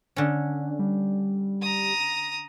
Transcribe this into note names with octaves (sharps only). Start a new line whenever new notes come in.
D3 C#4
G3
A#5 D#6